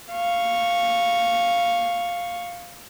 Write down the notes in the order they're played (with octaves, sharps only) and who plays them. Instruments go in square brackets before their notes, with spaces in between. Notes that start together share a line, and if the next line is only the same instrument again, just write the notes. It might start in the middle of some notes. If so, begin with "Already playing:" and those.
[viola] F5 C#6